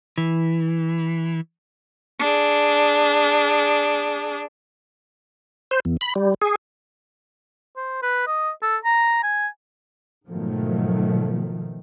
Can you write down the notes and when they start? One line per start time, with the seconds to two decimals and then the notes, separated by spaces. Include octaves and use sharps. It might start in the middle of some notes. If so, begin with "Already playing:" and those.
0.18 E3
2.19 D4 G#4
5.71 C5
5.85 E2
6.01 B5
6.15 G3
6.42 G#4
7.76 C5
8.02 B4
8.27 D#5
8.62 A4
8.85 A#5
9.23 G#5
10.26 G#2 B2 D#3 F3 F#3 A3